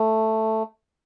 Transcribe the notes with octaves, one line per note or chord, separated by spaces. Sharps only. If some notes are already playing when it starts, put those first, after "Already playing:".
Already playing: A3